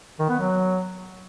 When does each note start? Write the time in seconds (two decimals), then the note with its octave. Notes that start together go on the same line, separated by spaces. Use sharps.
0.19 D#3
0.29 B3
0.39 F#3